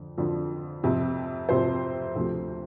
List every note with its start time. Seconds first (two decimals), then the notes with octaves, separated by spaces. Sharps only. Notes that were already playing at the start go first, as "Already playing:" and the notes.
Already playing: F2 D3
0.18 F2 D3 F3
0.84 F2 C3 F3
1.49 F2 C3 F3 C5
2.15 D2 C3 F3